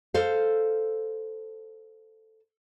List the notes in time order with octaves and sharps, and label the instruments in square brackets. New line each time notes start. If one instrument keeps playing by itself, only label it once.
[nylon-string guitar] A4 C5 F5